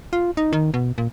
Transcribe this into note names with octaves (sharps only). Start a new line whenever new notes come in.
F4
D#4
D#3
B2
A#2